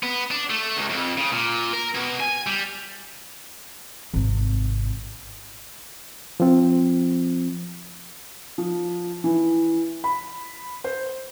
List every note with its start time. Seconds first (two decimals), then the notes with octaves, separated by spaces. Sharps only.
0.03 B3
0.31 D4
0.50 A3
0.77 C#2
0.90 F2
1.18 C#3
1.32 A#2
1.73 A#4
1.94 B2
2.20 G#5
2.47 G3
4.14 G#1 C3
6.40 F3 C4
8.58 F3
9.24 E3
10.04 B5
10.84 C5